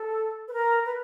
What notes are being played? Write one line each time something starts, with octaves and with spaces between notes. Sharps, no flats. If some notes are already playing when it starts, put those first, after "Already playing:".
Already playing: A4
B4
A#4
B4